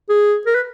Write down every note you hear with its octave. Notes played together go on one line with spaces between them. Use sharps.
G#4
A#4
B4